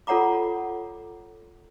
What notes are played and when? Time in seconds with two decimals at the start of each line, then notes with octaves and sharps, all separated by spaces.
0.07 F4 A4 C#5 F#5 A#5 D6